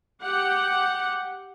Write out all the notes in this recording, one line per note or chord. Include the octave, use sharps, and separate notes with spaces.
G4 F#5